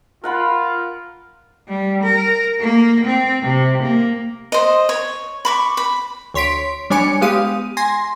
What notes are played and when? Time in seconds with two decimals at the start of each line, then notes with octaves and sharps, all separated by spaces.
0.24 F4 A#4 F#5 B5
1.69 G3
2.04 A#4
2.61 A#3
3.06 C4
3.43 C3
3.83 A#3
4.52 C5 D#5
4.89 C#5
5.45 B5 C#6 D6
5.77 B5
6.34 D2 C#5 C6 B6 D7
6.90 G3 D4 C#5 G#5 D6 C#7
7.21 G#3 B3 G4 F5 D#6 D#7
7.77 G#5 C6 A#6